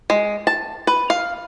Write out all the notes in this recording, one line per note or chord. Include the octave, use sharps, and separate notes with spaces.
G#3
A5
B4
F5